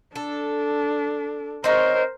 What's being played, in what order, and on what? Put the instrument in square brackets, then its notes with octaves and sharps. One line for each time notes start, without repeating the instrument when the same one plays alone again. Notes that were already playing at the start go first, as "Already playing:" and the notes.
[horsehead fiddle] D4 [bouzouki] A4
[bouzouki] C4 D#4 C#5 [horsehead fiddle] A#4 C5